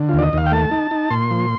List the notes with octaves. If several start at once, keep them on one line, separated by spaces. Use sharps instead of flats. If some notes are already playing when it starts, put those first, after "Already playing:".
Already playing: D3
D#2 F4
D5
D#5
D#2 F5
G5
A3 A5
D#4
D#4
A#2 C6
F3